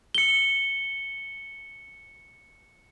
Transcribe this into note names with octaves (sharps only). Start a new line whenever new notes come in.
C#7 G7